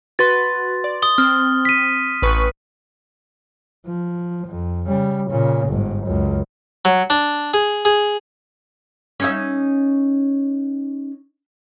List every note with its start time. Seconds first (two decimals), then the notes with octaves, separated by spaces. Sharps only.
0.19 F#4 B4 C6 A6
0.84 D5
1.02 D#6 G7
1.18 C4 F6
1.65 B6 D#7
2.22 A1 B4 C#6
3.86 F3
4.47 F2
4.87 C#3 G3
5.30 A#2 C#3
5.68 G1 G#2
6.06 C#2 F#2
6.85 F#3
7.10 D4
7.54 G#4
7.85 G#4
9.20 C#4 D#4 E5